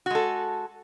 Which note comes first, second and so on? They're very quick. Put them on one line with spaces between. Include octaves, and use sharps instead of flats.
F#4 G#3 A4